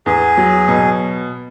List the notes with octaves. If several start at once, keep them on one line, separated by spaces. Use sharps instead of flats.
E2 G#4
F#3
B2